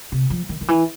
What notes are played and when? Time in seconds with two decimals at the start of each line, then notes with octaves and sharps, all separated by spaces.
0.12 C3
0.30 F3
0.49 D#3
0.61 D#3
0.68 E3